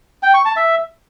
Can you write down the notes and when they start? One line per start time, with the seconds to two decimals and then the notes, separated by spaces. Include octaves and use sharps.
0.23 G5
0.34 C#6
0.45 A5
0.56 E5